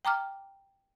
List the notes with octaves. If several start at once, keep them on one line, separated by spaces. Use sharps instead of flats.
G5 A#5 D6 F6